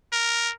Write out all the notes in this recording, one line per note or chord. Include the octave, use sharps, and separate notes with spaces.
A#4